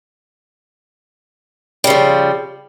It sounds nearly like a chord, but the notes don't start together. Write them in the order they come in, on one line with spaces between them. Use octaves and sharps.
G3 C#3 F3